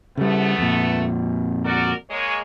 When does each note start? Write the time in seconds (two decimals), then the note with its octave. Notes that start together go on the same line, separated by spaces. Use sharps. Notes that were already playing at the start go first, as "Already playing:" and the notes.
0.17 C#3 G3 A3 B3
0.58 F2 A#2
1.65 F#4 A#4 D5
2.10 G#3 A#3 C#5